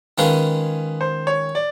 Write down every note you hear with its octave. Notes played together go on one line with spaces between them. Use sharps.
D#3 G#3 C#4 F4 G#4 B4
C5
C#5
D5